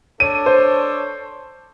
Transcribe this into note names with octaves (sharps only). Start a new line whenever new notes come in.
D4 A4 C#5 D#7
C5